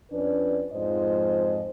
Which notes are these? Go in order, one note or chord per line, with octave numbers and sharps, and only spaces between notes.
F2 C#4 D4 B4 D5
F2 G#2 F3 C5 D#5